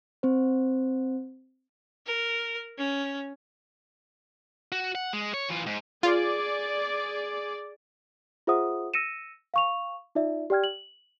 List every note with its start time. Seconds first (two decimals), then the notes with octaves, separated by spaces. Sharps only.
0.23 C4 C5
2.06 A#4
2.78 C#4
4.72 F#4
4.95 F#5
5.13 G#3
5.34 C#5
5.50 E3 F4
5.66 G#2
6.03 F4 G#4 D5
8.47 F4 G#4 C5 E5 F#5 D#6
8.94 E6 A#6 C#7 D#7 E7
9.54 F5 C#6 F7
10.15 D#4 F4 D5 E5
10.50 G4 D5 G5 F6 G#6
10.64 F#7